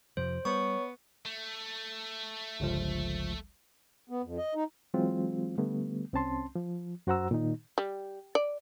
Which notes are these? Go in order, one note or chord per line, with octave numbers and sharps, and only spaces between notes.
F2 C3 F3 C5
G3 B3 C#5 C#6
A3
G1 C#2 F3
B3
F2
D#5
D#4
E3 F#3 G#3 C4 F4
D3 G3 A3 B3
C2 C4 C#4 A5 C6
F3
F#2 F#4 C5 F#5 A#5 E6
A#2 D#3 D#4
G3
D5